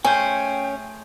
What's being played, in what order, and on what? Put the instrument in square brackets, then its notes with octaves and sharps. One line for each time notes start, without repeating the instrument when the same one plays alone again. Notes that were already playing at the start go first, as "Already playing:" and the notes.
[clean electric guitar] A3 G#4 C5 [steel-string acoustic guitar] C#4 [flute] G5 [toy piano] G#5